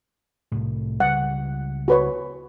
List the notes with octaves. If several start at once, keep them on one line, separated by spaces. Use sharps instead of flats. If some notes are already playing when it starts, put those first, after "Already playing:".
C2 A2
C#2 G3 F#5
F#4 B4 C#5